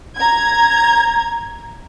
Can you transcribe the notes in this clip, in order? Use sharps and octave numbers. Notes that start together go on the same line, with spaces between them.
A#5 G#6